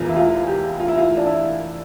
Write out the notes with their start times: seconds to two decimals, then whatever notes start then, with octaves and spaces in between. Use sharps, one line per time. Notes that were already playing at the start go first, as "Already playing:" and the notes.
Already playing: E1 E2 E3 F4
0.09 E4
0.16 F4
0.47 G4
0.80 F4
0.88 E4
0.97 F4
1.17 D4
1.26 E4